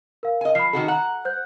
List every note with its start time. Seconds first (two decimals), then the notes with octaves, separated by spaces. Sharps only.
0.23 A#4 F5
0.41 D#5 G#5
0.55 F3 B5 C7
0.73 D#3 F#4 A4
0.88 F#5 A#5
1.25 C5 F#6 G6